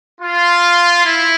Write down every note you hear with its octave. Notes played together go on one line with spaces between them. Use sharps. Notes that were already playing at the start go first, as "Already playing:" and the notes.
F4
E4